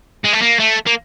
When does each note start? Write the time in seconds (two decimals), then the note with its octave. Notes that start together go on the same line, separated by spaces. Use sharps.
0.25 G#3
0.33 A3
0.42 A#3
0.60 A3
0.87 A#3